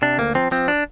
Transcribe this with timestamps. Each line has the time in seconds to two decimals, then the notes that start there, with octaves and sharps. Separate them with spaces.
0.02 C3 D4
0.18 D2 A#3
0.35 F3 C4
0.51 F3 C4
0.68 D4